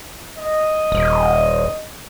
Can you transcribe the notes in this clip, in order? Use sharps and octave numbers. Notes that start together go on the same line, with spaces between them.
D#5
D#1